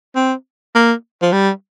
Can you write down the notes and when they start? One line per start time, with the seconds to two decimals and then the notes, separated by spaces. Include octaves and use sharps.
0.16 C4
0.75 A#3
1.22 F3
1.32 G3